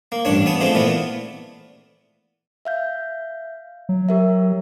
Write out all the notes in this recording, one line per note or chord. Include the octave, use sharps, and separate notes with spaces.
A#3
A1 G2 D4 C#5
B3 G#4 A5
F3 G#3 A3 C4
A#2 E3 A3 B3
E5 F5 G6
F#3
G4 A#4 E5